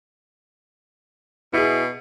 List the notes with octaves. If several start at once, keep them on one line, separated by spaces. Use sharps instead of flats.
B2 E4 G#4